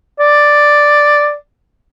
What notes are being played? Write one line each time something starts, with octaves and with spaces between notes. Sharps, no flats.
D5